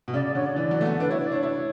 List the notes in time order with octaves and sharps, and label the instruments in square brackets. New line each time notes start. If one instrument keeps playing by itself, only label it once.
[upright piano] B2
[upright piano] C#3 [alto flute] D5
[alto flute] D5
[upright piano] D3 [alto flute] C#5
[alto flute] D5
[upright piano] E3 [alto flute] D5
[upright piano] F#3
A3
B3
[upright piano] D4 [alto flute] B4
[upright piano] E4 [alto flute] C#5
[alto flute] D5
[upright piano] D4 [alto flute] C#5
[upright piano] E4